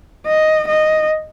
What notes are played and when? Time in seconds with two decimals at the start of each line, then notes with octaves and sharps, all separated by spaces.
0.26 D#5
0.68 D#5